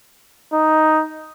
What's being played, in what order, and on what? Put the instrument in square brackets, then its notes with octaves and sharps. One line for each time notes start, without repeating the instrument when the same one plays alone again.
[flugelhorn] D#4